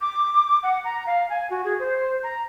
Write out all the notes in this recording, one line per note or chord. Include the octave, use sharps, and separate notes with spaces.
D6
F#5
A#5
F5
G#5
F#4
G#4
C5
A#5